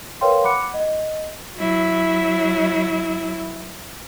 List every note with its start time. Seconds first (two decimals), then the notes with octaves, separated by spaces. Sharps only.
0.21 A#4 B4 C#5 F5 G5 C6
0.43 F#5 B5 D6 F#6 C#7
0.74 D#5
1.57 F#3 E4